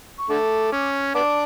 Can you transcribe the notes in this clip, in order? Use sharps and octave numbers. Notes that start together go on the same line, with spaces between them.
C#6
D3 A3 D6
C#4
B3 D4 D6